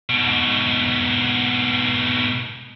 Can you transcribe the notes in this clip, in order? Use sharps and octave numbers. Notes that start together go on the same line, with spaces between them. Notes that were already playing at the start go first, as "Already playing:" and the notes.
G#2 B2